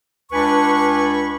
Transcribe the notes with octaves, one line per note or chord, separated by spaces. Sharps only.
C#2 D4 B4 G#5 B5 C#6